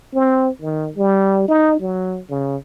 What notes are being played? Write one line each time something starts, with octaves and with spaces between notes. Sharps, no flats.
C4
D#3
G3
D#4
F#3
C#3